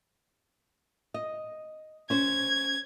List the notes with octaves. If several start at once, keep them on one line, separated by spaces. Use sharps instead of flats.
D#5
C#4 C5 G#6